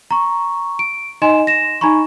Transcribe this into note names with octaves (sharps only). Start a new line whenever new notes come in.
A#5 C#6
D7
D#4 D#5 G#5 C6 E7
A#6 E7
D#4 G#5 A#5 B5 C#6